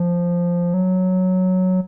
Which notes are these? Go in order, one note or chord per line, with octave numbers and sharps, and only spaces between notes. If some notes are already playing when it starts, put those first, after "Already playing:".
Already playing: F3
F#3